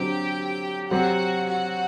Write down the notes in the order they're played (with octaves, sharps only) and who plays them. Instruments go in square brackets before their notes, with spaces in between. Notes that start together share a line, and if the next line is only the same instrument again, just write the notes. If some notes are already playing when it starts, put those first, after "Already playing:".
Already playing: [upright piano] D3 F#3 C4 [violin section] G4 G5
[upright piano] F#3 C4 G4 [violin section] F#4 F#5
[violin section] F#4 F#5